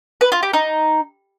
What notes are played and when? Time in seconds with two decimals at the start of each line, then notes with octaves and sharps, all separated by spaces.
0.21 B4
0.32 F4
0.43 G4
0.53 D#4